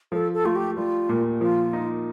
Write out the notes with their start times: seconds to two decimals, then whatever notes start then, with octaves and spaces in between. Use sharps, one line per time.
0.12 F3 A4
0.34 A4
0.44 A3 F4
0.56 G4
0.76 G3 F4
1.09 A#2
1.41 F3 F4
1.73 D#4